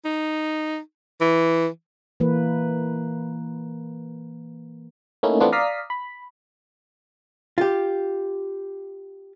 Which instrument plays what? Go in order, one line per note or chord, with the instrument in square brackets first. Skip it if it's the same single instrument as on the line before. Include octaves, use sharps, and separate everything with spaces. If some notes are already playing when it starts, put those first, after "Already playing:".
[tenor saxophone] D#4
E3
[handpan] E3 A#3 B4
[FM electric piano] A3 A#3 C#4 D#4 E4
E3 A3 B3 C4 D4 F4
D5 F5 A#5 D#6 B6 C7
B5
[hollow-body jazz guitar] F4 G4